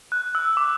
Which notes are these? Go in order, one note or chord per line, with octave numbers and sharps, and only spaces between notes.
F#6
E6
D6